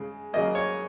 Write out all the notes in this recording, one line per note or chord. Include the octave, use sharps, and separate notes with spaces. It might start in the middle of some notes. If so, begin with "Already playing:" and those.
Already playing: C#3 G#3
C#3 F#3 A#3 D#5
C#5